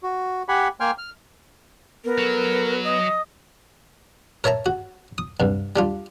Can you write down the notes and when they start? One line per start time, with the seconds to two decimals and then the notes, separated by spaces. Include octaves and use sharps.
0.03 F#4
0.48 G4 F#5 G#5 B5
0.80 A#3 G5 G#5 C6 F6
0.98 F6
2.05 B3 A#4
2.18 F#3 A4
2.84 D#5 D#6
4.44 A#4 C#5 E5 A5 A#5
4.66 F#4
5.18 D#6
5.40 C2 G2
5.76 G3 D4 F4